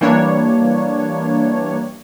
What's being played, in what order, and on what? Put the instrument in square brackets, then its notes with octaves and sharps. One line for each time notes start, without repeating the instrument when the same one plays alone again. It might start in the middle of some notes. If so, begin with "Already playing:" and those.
[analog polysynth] E3 G3 A#3 D4 C#5